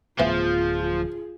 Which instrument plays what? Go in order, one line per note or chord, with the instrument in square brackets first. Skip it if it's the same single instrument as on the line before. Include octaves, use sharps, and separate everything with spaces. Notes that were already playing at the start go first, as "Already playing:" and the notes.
[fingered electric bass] D1 A3 B3 [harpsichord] E3 [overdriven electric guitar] F3 [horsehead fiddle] F4 G#4